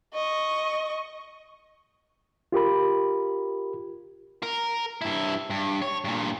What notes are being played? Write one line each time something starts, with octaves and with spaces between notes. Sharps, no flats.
D#5 C#6
F4 G4 A#4 B5
A#4
G2 E4
G2
C#5
G2 A#2